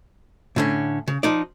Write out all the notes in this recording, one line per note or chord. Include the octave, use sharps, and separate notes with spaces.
A2 D3 C#4
C#3
F3 D#4 D5